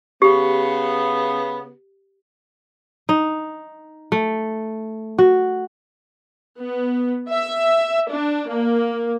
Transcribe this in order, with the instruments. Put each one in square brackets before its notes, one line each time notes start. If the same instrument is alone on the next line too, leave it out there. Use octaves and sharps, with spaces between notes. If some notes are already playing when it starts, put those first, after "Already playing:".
[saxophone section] C#3 B3 [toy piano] G4
[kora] D#4
A3
F#4
[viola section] B3
E5
D4
A#3